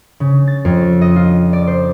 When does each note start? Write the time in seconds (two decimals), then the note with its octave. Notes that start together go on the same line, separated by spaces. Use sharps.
0.20 C#3
0.47 A6
0.65 F2
1.01 D#5
1.16 F4
1.53 D5
1.67 C5